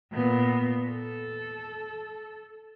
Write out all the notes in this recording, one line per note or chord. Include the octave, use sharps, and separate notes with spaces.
A#2 B3
A4